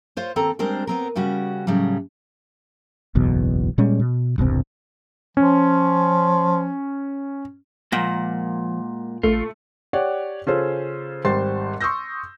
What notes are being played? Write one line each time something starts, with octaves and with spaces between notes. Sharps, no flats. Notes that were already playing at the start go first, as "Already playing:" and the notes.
F4 C5 C#5
D#2 C4 A4 A#5
G3 G#3 C4 D4 A#4 C5
B3 C4 A#4
C#3 G3 C#4 F#4
A2 C#3 F#3 G3
F#1 B1 E2 B2
A#2 G3 G#3 C#4
B2
E1 C2 G2 C4
F3 C#4
A#2 F3 G#3 A#3 F#5
A1 A3 F4
G4 C#5 D5 F#5
C#3 C#4 F4 G#4 A4 C5
G#1 G3 C5 C6 A6 C7
C6 C#6 D#6 E6 G6 A#6